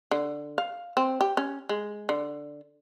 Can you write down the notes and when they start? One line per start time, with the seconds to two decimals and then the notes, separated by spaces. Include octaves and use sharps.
0.11 D3
0.58 F5
0.97 C4
1.21 G4
1.37 C#4
1.69 G#3
2.09 D3